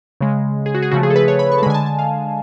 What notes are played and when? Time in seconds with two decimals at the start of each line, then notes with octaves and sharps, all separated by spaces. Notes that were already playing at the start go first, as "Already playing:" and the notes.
0.21 C#3 G#3
0.66 G#4
0.75 F#4
0.82 G#4
0.91 C#3 F3 A3 F#4
1.03 G#4
1.10 A4
1.16 B4
1.28 C#5
1.39 B5
1.52 C#6
1.58 A5
1.62 G#3 B5
1.66 D3 G#5
1.74 A5
1.86 A5
1.99 F5